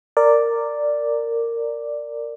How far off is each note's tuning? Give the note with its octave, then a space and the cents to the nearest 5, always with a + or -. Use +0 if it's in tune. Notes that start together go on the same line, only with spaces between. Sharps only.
A#4 -15 D5 +0